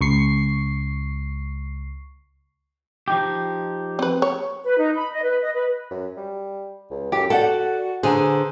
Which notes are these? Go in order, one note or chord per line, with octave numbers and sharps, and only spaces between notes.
C#2 C#6 C7
F3 D#4 G4
C4 B4
C#5
B4
D#4
B5
D#5
B4
D#5
B4
F#2
G3
C#2
F#2 G4 A4
F#4 A4 D5 F#5 G5
D3 G#4 B4 C5 G#5 A#5